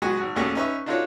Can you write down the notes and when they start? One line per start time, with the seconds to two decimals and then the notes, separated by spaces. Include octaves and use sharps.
0.02 F#3 G#3 B3 F#4 G#4
0.17 G#1 F#4
0.36 A#1 D#2 A3 C#4 F#4 G#4
0.55 C#4 D#4 B4 E5 C#6
0.86 D4 D#4 F4 F#4 A4 C#5